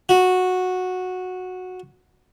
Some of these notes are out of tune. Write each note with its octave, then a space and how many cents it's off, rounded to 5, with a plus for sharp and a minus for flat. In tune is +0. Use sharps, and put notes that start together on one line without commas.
F#4 -10